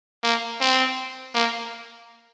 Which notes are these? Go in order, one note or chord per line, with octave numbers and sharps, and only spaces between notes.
A#3
C4
A#3